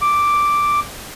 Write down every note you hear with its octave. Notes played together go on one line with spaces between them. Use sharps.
D6